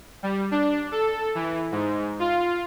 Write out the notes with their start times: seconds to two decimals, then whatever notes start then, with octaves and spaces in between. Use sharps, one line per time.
0.23 G3
0.51 D4
0.92 A4
1.35 E3
1.72 G#2
2.20 F4